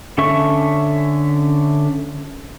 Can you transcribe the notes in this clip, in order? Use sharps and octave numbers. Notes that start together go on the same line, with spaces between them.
D3 C#4 A4 E5 C#6